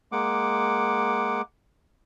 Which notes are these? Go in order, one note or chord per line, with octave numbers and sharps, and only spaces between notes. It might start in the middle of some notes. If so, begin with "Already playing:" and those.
G#3 A#3 F#5 D6